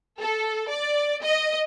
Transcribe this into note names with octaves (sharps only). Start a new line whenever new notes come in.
A4
D5
D#5